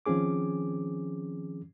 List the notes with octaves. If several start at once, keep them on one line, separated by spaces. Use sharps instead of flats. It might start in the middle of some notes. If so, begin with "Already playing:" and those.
D#3 F3 C4 C#4 G#4 D6